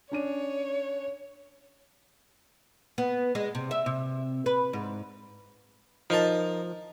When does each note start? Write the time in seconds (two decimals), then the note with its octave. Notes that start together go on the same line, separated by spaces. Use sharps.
0.11 C#4 D4 C#5 D#7
2.98 B3
3.35 G#3
3.55 C3
3.71 E5
3.86 C3
4.46 B4
4.73 G#2
6.10 F3 D#4 A#4 A5